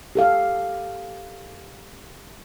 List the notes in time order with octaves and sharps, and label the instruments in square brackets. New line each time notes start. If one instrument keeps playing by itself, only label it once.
[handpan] G4 A4 F5